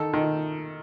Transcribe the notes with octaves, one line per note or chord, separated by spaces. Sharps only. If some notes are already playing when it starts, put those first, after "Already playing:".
Already playing: D#3 A4
D#3